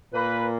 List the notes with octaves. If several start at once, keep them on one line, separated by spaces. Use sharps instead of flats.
A#2 A#3 B4